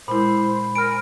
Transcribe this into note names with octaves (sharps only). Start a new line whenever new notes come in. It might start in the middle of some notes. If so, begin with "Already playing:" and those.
A#2 G#3 E4 C5 B5
A#4 G#5 B5 F6 D7